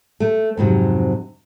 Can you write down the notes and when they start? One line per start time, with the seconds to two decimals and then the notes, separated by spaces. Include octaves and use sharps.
0.20 A3
0.57 F2 G#2 C3 F#3